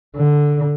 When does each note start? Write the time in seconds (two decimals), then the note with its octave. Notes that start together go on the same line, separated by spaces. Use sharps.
0.16 D3